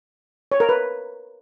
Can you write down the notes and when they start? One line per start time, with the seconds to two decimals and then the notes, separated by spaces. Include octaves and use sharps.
0.52 C#5
0.60 A#4
0.69 B4